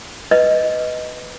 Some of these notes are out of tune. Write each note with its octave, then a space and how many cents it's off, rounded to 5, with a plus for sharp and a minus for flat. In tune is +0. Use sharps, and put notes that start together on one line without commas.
B4 +5 D#5 +5